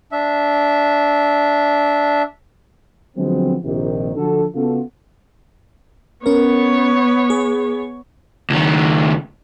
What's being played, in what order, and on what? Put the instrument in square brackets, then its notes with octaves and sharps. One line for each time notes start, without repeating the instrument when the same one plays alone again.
[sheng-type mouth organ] D4 E5
[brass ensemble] D3 F3 F#3 G#3 B3 C4
A#1 C3 D#3
D3 F3 D4 F#4 A4
C#3 B3 C#4 F4 F#4 A4
[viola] B3 C#5 [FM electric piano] C#4 A#4
[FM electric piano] G#4
[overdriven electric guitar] C#2 D#3